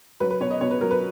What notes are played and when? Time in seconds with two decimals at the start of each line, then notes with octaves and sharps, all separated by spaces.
0.20 F#3 B4
0.31 B4
0.41 B2 C#5
0.51 D#5
0.61 B2 C#5
0.71 B4
0.81 F#3 A#4
0.91 B4